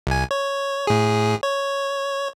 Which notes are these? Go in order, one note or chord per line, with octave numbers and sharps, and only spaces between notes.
C2 G#5
C#5
A2 G#4
C#5